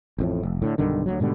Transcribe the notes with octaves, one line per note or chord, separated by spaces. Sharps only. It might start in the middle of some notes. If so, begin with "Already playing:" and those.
A1 F2 A2
F1
A2 D3
B1 G2 D3 D#3
D2 F3 F#3
G#2 B2 D3 G3